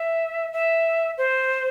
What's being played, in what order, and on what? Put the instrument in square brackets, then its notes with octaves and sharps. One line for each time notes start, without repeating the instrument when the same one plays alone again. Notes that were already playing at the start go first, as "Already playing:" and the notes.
Already playing: [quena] E5
E5
C5